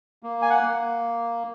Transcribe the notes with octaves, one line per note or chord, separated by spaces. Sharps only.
A#3
G#5
F#5
A#3